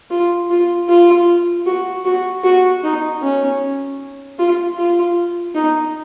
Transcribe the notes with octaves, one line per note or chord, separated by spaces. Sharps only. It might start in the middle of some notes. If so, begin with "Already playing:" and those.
F4
F4
F4
F#4
F#4
F#4
D#4
C#4
F4
F4
D#4